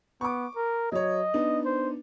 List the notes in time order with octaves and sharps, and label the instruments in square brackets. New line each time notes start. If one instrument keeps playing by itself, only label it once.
[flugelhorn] B3 [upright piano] C#6 D6
[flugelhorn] A#4
[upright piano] F#3 C#5 [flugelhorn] D#5
[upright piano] B3 D4 D#4
[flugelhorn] C5